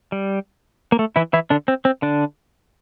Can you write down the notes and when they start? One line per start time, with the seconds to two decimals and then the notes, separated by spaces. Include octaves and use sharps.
0.12 G3
0.92 A#3
0.99 A3
1.16 E3 E4
1.33 E3 E4
1.50 D3 D4
1.68 C4
1.85 C4
2.02 D3 D4